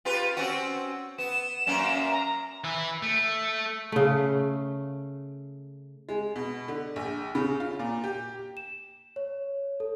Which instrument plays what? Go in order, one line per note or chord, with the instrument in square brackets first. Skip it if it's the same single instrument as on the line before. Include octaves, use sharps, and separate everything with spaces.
[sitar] F4 G4 B4
C4 C#4 F#4
[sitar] B3 [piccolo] E7
[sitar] F#2 A#3 C#4
[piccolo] A#5
[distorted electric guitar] E3 E4
A3
[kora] C#3 A3
[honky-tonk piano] G#3
B2
D3
A#1
C#3
F4
A#2
G4
[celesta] E7
C#5
A4